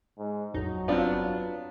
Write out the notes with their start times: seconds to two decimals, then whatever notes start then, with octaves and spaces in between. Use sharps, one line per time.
0.18 G#2
0.54 A1 F2 F#3 D#4
0.88 G1 B3 C4 D4 F4